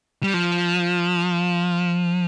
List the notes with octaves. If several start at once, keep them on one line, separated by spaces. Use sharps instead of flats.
G3
F3